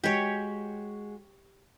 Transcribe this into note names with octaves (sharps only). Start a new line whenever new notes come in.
G#3 F#4 G4 C#5